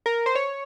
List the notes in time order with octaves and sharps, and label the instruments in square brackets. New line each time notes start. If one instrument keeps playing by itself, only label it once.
[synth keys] A#4
C5
C#5